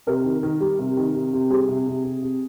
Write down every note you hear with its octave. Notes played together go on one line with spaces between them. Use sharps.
C3 A#4
D#3
D#3
G3
C3
D#3
C3
C3
G3 G#4
C3
C3
C3
C3